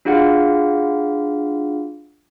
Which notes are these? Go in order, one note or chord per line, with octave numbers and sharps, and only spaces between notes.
D4 F4 F#4 G#4 F5 F#5